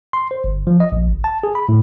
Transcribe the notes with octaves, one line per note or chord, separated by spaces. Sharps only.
C6
C5
G1
F3
D#5
A#1
G1
A5
G#4
B5
A2